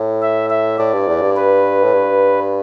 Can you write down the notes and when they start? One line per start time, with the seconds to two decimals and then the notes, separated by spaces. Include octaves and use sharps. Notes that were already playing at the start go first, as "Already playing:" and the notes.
Already playing: A2
0.22 E5
0.50 E5
0.78 A2 D5
0.93 G2
1.08 E2
1.22 G2
1.37 B4
1.83 A2
1.93 G2